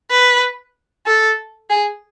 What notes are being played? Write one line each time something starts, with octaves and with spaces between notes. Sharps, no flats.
B4
A4
G#4